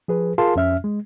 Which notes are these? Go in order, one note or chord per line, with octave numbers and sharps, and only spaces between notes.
F3 G#4 B4
F4 G#4 A#4 F5 A5 C6
F2 C#4 E5 F6
G#3